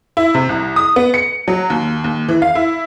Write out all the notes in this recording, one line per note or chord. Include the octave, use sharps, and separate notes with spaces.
E4
C3
C2
D#6
B3
C#7
F#3
D#2
D#2
E3
F5
E4